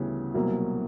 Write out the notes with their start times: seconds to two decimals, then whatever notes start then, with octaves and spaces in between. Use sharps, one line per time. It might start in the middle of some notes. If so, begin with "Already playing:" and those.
Already playing: D2 C#3 E3 G3 B3
0.34 C2 B2 F#3 A#3